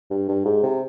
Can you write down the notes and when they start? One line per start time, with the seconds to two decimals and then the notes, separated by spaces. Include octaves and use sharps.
0.11 G2
0.29 G2
0.45 G#2
0.63 C3